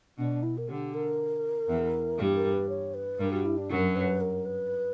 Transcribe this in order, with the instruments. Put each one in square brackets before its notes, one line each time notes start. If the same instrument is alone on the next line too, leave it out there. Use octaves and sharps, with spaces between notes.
[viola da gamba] B2 [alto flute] D4
[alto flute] E4
A#4
[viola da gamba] D3 [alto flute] G4
[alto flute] A#4
[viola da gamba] E2 E3
[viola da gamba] G2 G3 [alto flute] G4
[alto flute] A#4
B4
C#5
B4
[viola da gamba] G2 G3 [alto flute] A#4
[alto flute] F#4
E4
D4
[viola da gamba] F#2 F#3 [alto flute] A#4
[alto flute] B4
A#4
B4